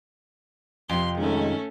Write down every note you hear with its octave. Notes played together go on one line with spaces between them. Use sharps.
F2 C3 C6
D#3 G#3 A3 C#4 D#4